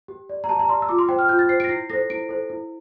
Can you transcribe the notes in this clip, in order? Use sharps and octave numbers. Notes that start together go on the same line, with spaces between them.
G4
D5
A#5
G4 A5
A#5
D5 C6
E6
F4 D6
C6
C5 G5
F6
F4 G6
A6
C5 C7
D7
A#6
E4 C7
A4 C5 A#6
E4 D7
A4 C5
E4